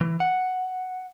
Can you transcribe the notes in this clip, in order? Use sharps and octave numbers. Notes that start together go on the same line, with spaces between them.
E3
F#5